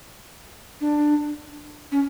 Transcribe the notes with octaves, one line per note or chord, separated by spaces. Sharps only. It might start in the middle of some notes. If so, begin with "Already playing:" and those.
D4
C#4